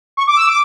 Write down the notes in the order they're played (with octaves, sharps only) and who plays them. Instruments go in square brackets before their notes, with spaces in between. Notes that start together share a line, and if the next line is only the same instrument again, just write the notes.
[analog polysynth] C#6
D6
E6
D6